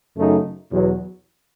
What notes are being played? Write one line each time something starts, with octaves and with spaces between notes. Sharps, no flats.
F#2 C#3 F#3 A3 D#4
E2 B2 F#3